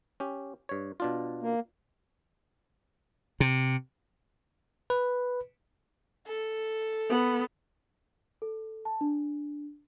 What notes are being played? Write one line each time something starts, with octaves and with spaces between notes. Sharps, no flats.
C#4 G4
G2 C#5
B2 D4 F4
A#3
C3
B4
A4
B3
A4
A5
D4